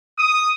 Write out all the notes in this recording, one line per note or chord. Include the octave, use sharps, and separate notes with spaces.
D#6